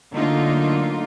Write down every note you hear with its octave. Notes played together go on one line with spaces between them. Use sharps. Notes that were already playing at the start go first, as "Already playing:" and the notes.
D3 F#3 A3 A#3 D#4 F4